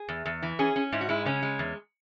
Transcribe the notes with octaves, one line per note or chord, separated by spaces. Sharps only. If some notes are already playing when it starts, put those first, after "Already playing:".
Already playing: G#4
E2
E2
E3
C#4 G#4
C#4
G#2 E4
F#4
G#3 E4
C#3 C#4
G#3
E2